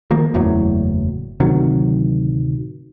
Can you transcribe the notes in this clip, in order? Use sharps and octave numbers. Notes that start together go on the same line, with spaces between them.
D#3 F3 A#3
F#1 E2 A2 F#3
D1 C3 D#3 F#3